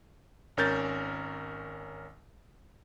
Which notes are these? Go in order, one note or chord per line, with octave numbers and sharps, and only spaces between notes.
G#1 C#4 A#4 G6 A6